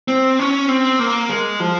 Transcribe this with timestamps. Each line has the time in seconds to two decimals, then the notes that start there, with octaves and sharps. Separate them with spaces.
0.08 C4
0.39 C#4
0.68 C4
0.99 A#3
1.29 G#3
1.60 F3